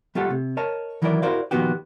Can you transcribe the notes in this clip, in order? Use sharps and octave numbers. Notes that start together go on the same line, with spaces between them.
G3 A3 F4 G4 A4 F#5
C3
A#4 C#5 D#5 A5
D#3 E3 F#3 E4 A#4 D5
E4 F#4 A#4 C5 D5 F5
A#2 D#3 F3 B3 F#4 G4